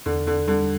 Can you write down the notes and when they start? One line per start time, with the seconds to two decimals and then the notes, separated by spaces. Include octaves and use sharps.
0.06 E2 D3
0.27 D3
0.48 D3 G3